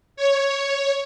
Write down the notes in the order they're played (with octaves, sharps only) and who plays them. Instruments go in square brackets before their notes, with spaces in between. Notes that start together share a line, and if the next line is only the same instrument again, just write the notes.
[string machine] C#5